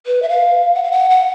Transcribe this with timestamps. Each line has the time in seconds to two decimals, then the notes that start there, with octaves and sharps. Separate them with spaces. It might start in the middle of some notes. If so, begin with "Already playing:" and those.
0.06 B4
0.22 E5
0.29 F5
0.75 F#5
0.84 F5
0.92 F#5
1.10 F#5